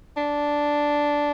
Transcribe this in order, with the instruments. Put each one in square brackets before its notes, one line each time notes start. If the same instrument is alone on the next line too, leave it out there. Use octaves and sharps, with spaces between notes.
[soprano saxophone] D4